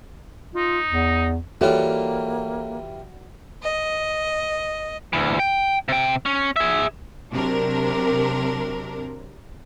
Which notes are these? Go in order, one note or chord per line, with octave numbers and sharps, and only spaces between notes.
D#4 F4
E2
E3 G3 A#3 F4 F#4 A4 C#5 D5
D#5
D2 E3
G5
C3 G5
C#4
G#4 E5
C3 F#3 D4 A#4